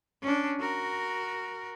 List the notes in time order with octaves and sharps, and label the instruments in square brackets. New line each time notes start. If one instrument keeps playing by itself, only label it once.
[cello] C#4 D4
F#4 A#4